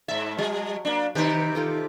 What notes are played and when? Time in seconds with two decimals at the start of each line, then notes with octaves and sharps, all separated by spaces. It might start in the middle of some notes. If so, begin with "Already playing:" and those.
0.08 G#2 E5 A5
0.38 F#3 G3
0.85 A#3 D4
1.15 C3 D#3 D#4 G4 B4
1.55 F4 A4 D#5